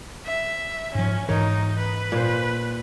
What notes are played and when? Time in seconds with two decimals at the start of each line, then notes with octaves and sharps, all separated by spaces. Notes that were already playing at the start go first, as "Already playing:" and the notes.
0.24 E5
0.95 G#2 F3 C#4
1.28 G#2 E3 D#4 A#4 C#5
1.79 B4
2.12 A#2 C5